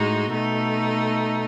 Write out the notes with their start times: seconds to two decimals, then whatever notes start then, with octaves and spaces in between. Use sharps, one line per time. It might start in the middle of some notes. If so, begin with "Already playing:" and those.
Already playing: A2 G#3 D#4 F#4
0.31 B2 A3 D#4